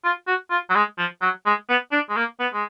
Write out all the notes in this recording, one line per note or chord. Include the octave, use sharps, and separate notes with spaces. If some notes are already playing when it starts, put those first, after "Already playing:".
F4
F#4
F4
F#3
G#3
F3
F#3
G#3
B3
D4
G#3
A#3
B3
G#3